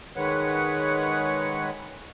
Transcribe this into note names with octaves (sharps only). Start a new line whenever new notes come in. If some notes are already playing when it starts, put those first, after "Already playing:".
D#3 G#3 B4 C#5 F#5